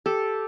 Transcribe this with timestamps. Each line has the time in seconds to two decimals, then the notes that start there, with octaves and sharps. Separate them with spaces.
0.06 G4 A4